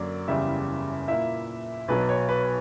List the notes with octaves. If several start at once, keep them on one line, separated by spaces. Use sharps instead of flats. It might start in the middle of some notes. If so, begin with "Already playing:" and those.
Already playing: F#2 D3 F#3 A#3 D5
F#1 E2 C#3 G3 E5
A#2 A#3 E4 E5
B1 B2 F#3 B4
C#5
B4